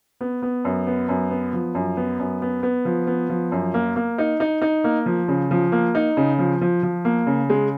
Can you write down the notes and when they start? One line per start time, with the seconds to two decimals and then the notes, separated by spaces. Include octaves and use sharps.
0.21 B3
0.42 B3
0.65 F#2
0.87 B3
1.09 F#2
1.31 B3
1.53 F3
1.75 F#2
1.97 B3
2.19 F#2
2.42 B3
2.63 B3
2.85 F3
3.07 B3
3.29 F3
3.52 F#2
3.74 A#3
3.96 A#3
4.18 D#4
4.40 D#4
4.62 D#4
4.84 A#3
5.06 F3
5.28 C#3
5.51 F3
5.72 A#3
5.95 D#4
6.17 C#3
6.39 F3
6.61 F3
6.83 F3
7.05 A#3
7.27 C#3
7.50 G#3